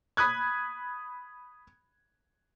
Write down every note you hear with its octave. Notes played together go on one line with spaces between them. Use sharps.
B5 D#6 F#6 G#6